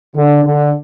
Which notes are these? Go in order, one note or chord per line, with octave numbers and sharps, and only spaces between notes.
D3
D3